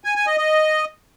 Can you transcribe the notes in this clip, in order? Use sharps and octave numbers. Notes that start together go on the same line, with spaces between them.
G#5
G#5
D#5
D#5